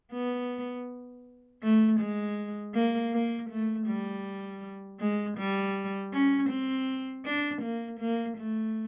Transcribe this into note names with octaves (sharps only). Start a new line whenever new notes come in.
B3
A3
G#3
A#3
A#3
A3
G3
G#3
G3
C#4
C4
D4
A#3
A#3
A3